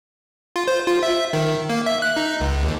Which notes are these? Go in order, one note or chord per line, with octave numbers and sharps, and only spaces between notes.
F4
C5
F4
E5
D#3
A#3
E5
F#6
D#4
C#2
D#2